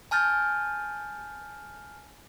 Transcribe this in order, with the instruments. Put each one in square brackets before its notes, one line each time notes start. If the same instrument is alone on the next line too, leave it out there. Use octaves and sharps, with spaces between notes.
[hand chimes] G#5 A5 F6 G6 A6